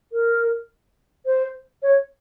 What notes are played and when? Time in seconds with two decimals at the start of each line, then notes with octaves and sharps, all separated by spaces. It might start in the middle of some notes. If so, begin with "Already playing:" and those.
0.13 A#4
1.26 C5
1.82 C#5